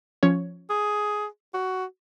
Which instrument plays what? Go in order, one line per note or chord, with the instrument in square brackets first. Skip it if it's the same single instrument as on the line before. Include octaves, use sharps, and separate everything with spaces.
[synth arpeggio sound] F3 C#4 C#5
[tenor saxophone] G#4
F#4